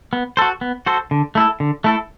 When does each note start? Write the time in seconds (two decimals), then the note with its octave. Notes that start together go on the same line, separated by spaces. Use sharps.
0.13 B3
0.37 F#4 A4 C5
0.61 B3
0.86 F#4 A4 C5
1.11 D3
1.35 A3 E4 A4
1.60 D3
1.84 A3 E4 A4